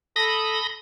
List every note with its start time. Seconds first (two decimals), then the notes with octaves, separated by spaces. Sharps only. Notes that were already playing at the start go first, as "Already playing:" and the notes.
0.16 A4 B5 D#6 A#6